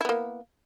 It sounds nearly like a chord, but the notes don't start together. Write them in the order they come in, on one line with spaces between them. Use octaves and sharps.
E4 B3 A#3